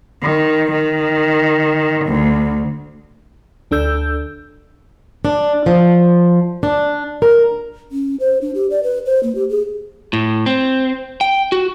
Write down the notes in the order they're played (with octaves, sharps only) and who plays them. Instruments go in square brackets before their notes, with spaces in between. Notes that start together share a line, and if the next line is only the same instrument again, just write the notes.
[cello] D#3
D#3
D2
[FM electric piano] D2 D4 A4 E6 G6
[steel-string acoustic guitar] D4
F3
D4
A#4
[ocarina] C#4
C5
D4
G4
D5
B4
C5
A#3
G4
G#4
[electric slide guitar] A2
C4
G5
F#4